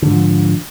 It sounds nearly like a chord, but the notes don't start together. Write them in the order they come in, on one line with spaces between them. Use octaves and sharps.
D3 G#2 F3